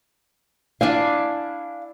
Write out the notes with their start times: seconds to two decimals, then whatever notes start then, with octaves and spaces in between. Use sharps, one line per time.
0.81 D4 E4 F5 G#5